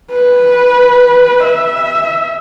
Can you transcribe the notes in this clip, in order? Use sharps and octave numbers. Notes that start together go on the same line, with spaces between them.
B4
E5